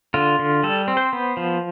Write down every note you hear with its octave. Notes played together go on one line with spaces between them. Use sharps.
D3 F4
D3
G3 A4
C4
C5
B3
F3